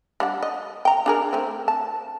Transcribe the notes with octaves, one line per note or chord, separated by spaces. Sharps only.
G3 D4 F#5
D#5
G5 A#5
D4 G#4 A#4
A3 C4
A5